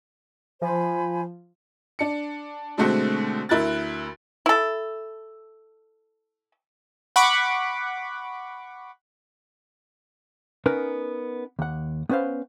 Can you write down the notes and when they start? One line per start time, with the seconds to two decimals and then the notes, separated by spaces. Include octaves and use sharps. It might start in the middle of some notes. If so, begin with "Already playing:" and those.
0.62 F3 C5 G#5 B5
1.99 D4 C#7
2.77 B2 D3 G#3 A3 C4 F#4
3.49 D2 E4 A#4 F#6 A6
4.46 E4 A4
7.16 F#5 B5 C#6 D6
10.66 B3 C#4 D#4 A#4 B4
11.59 D#2 F#5
12.09 B3 C#4 B4 C5 F5